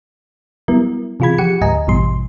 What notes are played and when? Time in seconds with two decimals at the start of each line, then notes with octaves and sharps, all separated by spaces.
0.68 F#3 G3 B3 E4 A#4
1.20 C3 E3 F4 G#4 B5 G#6
1.38 F3 G4 F#5 C#7
1.61 D2 G#2 D#5 G#5 A#5
1.87 A1 G2 B2 E3 G3 C6